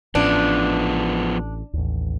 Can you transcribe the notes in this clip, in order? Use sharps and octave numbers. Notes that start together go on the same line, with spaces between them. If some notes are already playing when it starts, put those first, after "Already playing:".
A1 A2 F3 B3 C#4 D4
A1 D#2